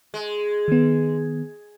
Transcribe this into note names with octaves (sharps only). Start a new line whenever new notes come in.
G#3
D#3 B3